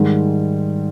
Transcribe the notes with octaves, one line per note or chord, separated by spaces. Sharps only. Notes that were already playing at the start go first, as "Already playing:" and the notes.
Already playing: G#2 D#3 G3 G#3